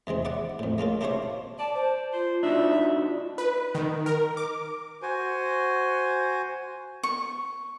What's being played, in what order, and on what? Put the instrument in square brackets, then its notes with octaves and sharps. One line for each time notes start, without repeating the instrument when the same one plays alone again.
[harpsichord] E2 C3 G#3 C4
E4 D5 F#5
F2 A2
G#3 A#3 C#4 F4
D4 E4 F4 G4 C5 C#5
[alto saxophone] D5 [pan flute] A5
[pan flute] C5
[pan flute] F4 [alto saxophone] C5
[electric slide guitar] D4 D#4 F#4 [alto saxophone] E5
[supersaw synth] B4
D#3
A#4
D6
[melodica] F#4 C5 G#5
[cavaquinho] C#6